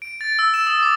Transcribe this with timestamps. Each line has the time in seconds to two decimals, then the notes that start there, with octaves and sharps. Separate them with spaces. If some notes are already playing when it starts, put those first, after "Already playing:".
0.02 D7
0.21 A6
0.39 E6
0.54 E7
0.67 D#6
0.83 D6